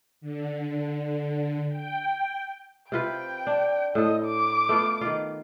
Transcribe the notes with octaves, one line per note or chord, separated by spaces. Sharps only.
D3
G5
C3 F4 B4 G5
D4
A2 A4 D#5
D6
A3 B3 F4
D#3 F4